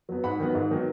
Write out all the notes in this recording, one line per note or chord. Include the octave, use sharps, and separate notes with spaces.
F#3 B3
G#2 F#5 B5
D#3 F#3 B3
G#2
D#3 F#3 B3